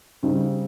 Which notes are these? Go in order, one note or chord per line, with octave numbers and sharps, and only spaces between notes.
C#3 G3 C4 D#4